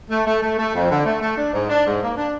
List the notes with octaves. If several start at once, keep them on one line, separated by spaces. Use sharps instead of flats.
A3
A3
A3
A3
F2
D3
A3
A3
D4
G#2
D4
G#2
A#3
D4